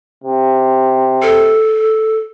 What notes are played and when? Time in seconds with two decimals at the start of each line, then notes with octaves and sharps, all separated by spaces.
0.24 C3
1.22 A4